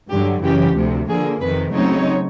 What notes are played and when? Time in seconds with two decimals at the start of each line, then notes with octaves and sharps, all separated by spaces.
0.10 G2 D3 F#3 G4
0.42 F#2 C#3 E3 G4
0.76 D2 C3 F3
1.08 D3 F3 A#3 G#4
1.40 F2 C3 D#3 B4
1.73 C#3 F#3 A3 C4 D#4 C#5